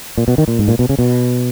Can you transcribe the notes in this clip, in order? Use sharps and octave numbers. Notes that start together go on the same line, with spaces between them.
A#2
B2
D#3
A#2
G#2
A#2
B2
C#3
B2